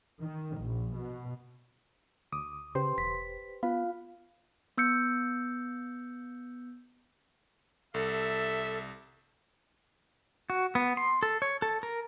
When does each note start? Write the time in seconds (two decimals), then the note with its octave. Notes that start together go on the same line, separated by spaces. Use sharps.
0.22 D#3
0.59 A#1
0.95 B2
2.32 D2 D6 D#6
2.75 C#3 G4 B4 C5 C6
2.98 E1 B6
3.63 B3 F4 F5 B5
4.78 B3 E6 G6 C#7
7.94 C2 A4 E5
10.50 F#4
10.75 B3
10.97 C6
11.23 A4
11.42 C#5
11.62 A4
11.83 A#4